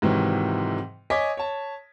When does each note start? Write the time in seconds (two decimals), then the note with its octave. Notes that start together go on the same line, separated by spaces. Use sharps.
0.02 G#2 C3 D#3 E3 F#3 G#3
1.10 C#5 D#5 G#5 D6 B6
1.37 C#5 A5